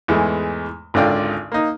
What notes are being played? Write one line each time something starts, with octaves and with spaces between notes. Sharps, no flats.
E2 G#2 E3 G#3 A3
G#1 C#2 D3 F4 D5 G5
A#3 D#4